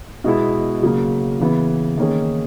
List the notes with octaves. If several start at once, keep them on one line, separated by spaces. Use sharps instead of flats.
B2 G#3 B3 E4
C#3 F#3 A#3
C#3 E3 B3
D#3 A#3 C#4 G#4